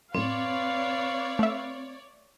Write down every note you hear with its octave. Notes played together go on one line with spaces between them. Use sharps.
F#2 A2 C4 B4 C#5 D5 F5
A3 E5